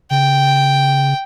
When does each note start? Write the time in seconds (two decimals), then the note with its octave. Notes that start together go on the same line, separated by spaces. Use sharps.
0.11 C#3 G5